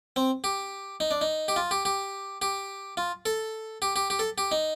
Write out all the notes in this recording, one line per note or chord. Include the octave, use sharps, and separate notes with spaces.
C4
G4
D#4
D4
D#4
G4
F4
G4
G4
G4
F4
A4
G4
G4
G4
A4
G4
D#4